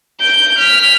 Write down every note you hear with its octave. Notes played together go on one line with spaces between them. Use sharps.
G6 D7
F6 B6